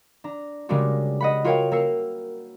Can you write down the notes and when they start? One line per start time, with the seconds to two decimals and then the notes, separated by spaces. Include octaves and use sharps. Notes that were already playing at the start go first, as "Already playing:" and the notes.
0.24 D4 A#5
0.69 C#3 G3 G#3 A#3 D4 F#4
1.21 D#5 F#5 B5
1.44 F4 F#4 A#4 C#5 F5 G5
1.71 A#3 A#4 E6 C7 C#7